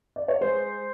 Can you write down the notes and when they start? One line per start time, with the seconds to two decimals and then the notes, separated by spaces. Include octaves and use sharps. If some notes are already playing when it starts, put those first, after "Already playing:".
0.16 D5
0.28 C#5
0.41 G#3 C5